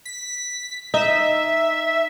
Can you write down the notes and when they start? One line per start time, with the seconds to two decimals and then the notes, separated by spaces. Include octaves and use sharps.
0.05 B6
0.94 D#4 E5